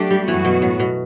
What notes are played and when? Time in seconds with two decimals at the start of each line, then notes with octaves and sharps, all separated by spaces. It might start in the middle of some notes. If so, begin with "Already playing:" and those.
Already playing: F#3 A3 D4 G4
0.11 G3
0.28 F#2 E3 F#3 B3 F#4
0.45 B2
0.62 A2
0.80 B2